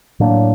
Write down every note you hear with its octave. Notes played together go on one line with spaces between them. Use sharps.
A2 F#3 A#3 D4